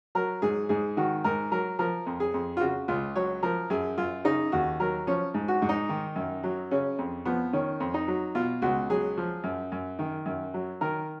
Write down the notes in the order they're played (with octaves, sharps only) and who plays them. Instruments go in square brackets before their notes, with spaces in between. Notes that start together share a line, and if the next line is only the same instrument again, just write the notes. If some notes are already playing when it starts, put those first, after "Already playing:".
[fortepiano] F#3 A#4
G#2 G#4
G#2 G#4
D#3 F#4
G#2 A#4
F#3 A#4
F3 A#4
F2
G#4
F2
F4
C#3 F#4
C#2 F4
F#3 C#5
F3 A#4
F#2 G#4
F#2 F4
C#3 D#4
D#2 F#4
F#3 A#4
F3 C#4
G#2
F#4
G#2
D#4
D#3
F#2
F#3
C#3 C#4
F2
F3 B3
D#3 C#4
F2
D#4
F#3
B2 F4
C#2 F#4
F#3 G#4
F3
F#2
F#2
D#3
F#2
F#3
D#3 A#4